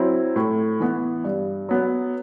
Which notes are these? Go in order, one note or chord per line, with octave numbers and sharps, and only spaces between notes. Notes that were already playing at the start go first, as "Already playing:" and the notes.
Already playing: F#3 C4 E4
A2
E3 B3
G2
F#3 B3